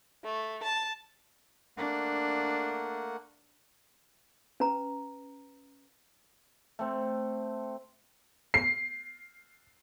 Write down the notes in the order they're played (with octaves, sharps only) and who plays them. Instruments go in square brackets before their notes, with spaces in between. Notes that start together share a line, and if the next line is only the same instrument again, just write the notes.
[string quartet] A3
A5
[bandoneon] A3 A#3 F#5 [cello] D4
[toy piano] C#4 B4 A#5
[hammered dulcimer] A3 C4
[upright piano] C7